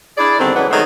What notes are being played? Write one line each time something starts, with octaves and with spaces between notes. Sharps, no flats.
D4 E4 G#4 D5
E2 D3 D#3 G3 C4
C#3 E3 F#3 G#3 B3 D4
D#3 F#3 G#3 A3 B3 D#4